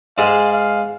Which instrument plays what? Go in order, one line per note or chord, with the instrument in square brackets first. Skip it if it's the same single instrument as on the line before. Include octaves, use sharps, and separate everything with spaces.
[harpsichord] G#2 G#3 [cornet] F5
[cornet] F5